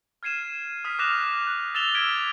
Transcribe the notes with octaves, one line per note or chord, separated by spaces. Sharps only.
F6 G#6 C7 D#7 E7
D#6 F6 B6
D6 F6 F#6 A#6 E7 F7
F#6
E6 A6 E7 F7 G7
E6 F6 G#6 B6 D7